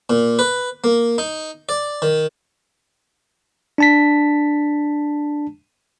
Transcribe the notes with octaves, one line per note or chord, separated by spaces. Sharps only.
A#2
B4
A#3
D#4
D5
D#3
D4 A5 B6